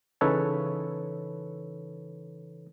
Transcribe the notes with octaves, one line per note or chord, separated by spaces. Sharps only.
C#3 E3 D#4 A4 B4 C#5